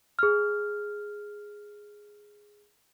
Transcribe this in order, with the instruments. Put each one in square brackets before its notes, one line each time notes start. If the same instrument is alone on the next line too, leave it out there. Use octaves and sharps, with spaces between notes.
[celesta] G#4 F6